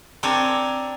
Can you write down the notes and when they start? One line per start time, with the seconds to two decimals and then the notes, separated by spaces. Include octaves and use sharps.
0.23 C4 D4 A#4 C#5 G#5